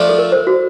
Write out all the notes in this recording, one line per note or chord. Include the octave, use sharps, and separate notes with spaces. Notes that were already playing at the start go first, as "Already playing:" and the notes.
Already playing: F3 A3 D4
A4
A#4
C5
F#4